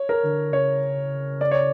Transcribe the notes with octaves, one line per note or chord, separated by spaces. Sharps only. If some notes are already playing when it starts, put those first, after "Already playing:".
Already playing: C#5
A#4
D3
C#3 C#5
D5
C#5